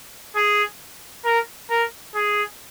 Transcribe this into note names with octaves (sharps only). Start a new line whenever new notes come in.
G#4
A#4
A#4
G#4